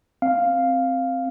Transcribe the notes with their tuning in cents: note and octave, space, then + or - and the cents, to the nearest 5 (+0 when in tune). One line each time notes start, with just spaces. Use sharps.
C4 +5 F5 +0